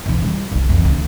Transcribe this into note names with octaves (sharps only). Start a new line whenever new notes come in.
E2 B2
G3 E4
C2 C#3
F2 E3
D2